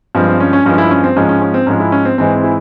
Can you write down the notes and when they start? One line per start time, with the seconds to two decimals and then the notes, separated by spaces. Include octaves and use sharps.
0.15 G2 F3 G#3 C4
0.28 C4
0.40 C#4
0.53 C#4
0.65 G2 F3 G#3 C#4
0.78 E4
0.91 C#4
1.04 C4
1.16 G#2 F3 G#3 C#4
1.29 C#4
1.42 C#4
1.54 C4
1.67 G#2 F3 G#3 C#4
1.80 E4
1.92 C#4
2.05 C4
2.18 G#2 E3 G#3 C4
2.35 C4
2.44 E4